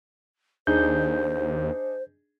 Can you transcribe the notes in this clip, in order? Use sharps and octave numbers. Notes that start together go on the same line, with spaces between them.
D#2 D4 D#4 G#4 C5 G6